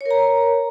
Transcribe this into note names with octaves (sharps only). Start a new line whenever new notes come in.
A#4 C#5 A#5